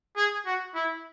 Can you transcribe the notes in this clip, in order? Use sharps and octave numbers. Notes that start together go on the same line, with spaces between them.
G#4
F#4
E4